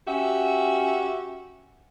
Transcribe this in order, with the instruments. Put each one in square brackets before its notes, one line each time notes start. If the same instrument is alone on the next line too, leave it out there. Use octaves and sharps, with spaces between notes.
[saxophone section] C#4 F#4 G4 E5